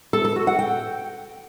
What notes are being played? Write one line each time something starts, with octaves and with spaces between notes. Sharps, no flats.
A4
A4
F#4
F#5
G5